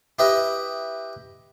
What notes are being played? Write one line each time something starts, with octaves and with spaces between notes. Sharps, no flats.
E4 G4 B4 D#5 E5